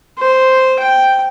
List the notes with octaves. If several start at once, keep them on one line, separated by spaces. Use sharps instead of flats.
C5
G5